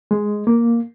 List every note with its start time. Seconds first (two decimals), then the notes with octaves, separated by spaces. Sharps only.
0.11 G#3
0.47 A#3